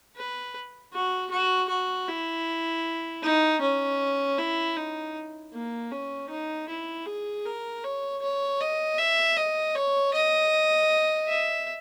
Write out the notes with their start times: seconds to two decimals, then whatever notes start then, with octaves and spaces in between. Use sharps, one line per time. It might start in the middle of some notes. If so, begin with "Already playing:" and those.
0.16 B4
0.93 F#4
1.31 F#4
1.69 F#4
2.08 E4
3.23 D#4
3.61 C#4
4.38 E4
4.76 D#4
5.53 A#3
5.91 C#4
6.30 D#4
6.68 E4
7.06 G#4
7.45 A#4
7.84 C#5
8.22 C#5
8.60 D#5
8.98 E5
9.37 D#5
9.75 C#5
10.14 D#5
11.28 E5